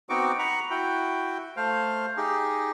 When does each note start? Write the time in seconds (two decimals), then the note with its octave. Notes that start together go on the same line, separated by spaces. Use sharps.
0.09 B3 C4 D#4 F#4 C#6 D6
0.39 F#5 A#5 B5 C#6
0.70 E4 F#4 G5
1.57 A3 C5 F5
2.17 D#4 G4 G#4